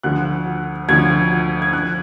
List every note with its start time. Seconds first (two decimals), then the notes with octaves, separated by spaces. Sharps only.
0.03 D2 D3 F3 F#6
0.88 D2 D3 F3 G#6
1.62 G#6
1.73 F3 F#6